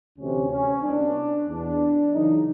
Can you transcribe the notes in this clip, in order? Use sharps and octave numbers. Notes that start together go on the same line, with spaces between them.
D2 C3 E3 C#4
C#4
C2 B2 D4
E2 B2 D4
F#2 C#3 E3 D#4